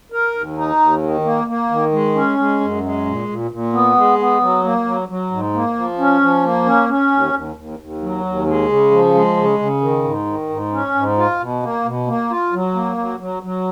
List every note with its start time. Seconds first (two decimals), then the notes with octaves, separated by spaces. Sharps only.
0.12 A#4
0.34 D#2
0.58 D#4
0.80 D#2
1.03 D#3
1.24 A#3
1.48 A#3
1.70 D#3
1.92 G#3
2.15 C#4
2.38 G#3
2.60 F#2
2.83 G#3
3.06 A#2
3.28 A#2
3.51 A#2
3.73 B3
3.96 G#3
4.19 B3
4.41 F#3
4.64 A#3
4.85 F#3
5.08 F#3
5.31 G#2
5.53 A#3
5.75 F3
5.98 C#4
6.21 F3
6.44 A#3
6.66 C#4
6.89 C#4
7.12 D#2
7.33 D#2
7.56 D#2
7.79 D#2
8.02 F#3
8.24 D#2
8.47 G#3
8.69 C#3
8.91 F3
9.14 G#3
9.37 C#3
9.59 C#3
9.81 D#3
10.04 G#2
10.26 D#3
10.50 G#2
10.72 C#4
10.95 G#2
11.18 F4
11.40 B2
11.63 A#3
11.85 B2
12.08 A#3
12.30 F4
12.53 F#3
12.75 A#3
12.98 F#3
13.20 F#3
13.43 F#3